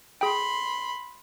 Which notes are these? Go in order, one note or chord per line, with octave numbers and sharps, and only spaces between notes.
G#4 G5 B5 C6